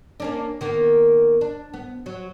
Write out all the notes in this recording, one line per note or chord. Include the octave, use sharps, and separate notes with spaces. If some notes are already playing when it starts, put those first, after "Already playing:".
A#3 C#4 D4
D#3 A#3 B3
D4
B3
F#3